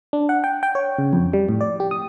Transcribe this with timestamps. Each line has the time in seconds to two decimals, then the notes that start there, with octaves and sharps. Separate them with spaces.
0.13 D4
0.29 F#5
0.44 G5
0.63 G5
0.75 C#5
0.98 C#3
1.13 F2
1.33 G3
1.49 A2
1.61 D5
1.80 G4
1.91 D#6